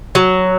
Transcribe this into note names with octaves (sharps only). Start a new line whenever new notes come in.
F#3